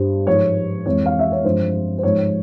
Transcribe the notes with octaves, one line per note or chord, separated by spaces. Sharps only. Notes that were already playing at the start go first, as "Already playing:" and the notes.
Already playing: G2 G3 C5
G#2 F3 G#3 C#5
F2 E3 G#3 C#5
F5
E5
C#5
G2 F3 G#3 C5
C5
G#2 F3 G#3 C#5